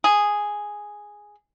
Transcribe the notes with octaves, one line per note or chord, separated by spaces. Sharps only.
G#4